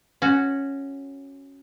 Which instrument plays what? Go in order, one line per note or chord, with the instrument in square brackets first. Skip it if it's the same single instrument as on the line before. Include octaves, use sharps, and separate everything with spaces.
[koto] C#4 F#4